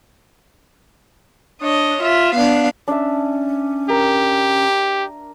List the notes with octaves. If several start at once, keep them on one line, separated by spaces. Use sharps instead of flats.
D4 C#5 D#5
F4 E5
B3 D4 F5
C#4 D4 E5
G4 A#4